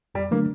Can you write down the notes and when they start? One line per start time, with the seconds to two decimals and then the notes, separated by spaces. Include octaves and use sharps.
0.15 F2 G3
0.31 D3 F#3 A3 A#3 D4